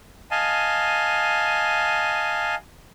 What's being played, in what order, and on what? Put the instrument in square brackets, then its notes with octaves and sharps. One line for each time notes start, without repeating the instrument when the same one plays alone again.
[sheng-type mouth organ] D#5 F5 G#5 A5